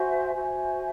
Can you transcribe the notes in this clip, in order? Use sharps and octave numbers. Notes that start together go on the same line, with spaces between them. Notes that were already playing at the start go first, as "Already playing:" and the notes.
Already playing: F#4 C5 E5 G#5
F#4 C5 E5 G#5